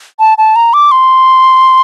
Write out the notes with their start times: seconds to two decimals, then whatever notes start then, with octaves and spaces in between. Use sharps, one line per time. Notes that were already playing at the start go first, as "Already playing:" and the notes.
0.20 A5
0.38 A5
0.56 A#5
0.73 D6
0.91 C6